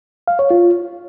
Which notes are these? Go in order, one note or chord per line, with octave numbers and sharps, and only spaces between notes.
F5
C#5
F4